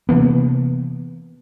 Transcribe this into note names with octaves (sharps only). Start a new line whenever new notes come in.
C3 E3 A#3 B3